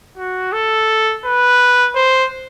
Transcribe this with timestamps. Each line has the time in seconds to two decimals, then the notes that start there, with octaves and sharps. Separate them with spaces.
0.18 F#4
0.53 A4
1.25 B4
1.95 C5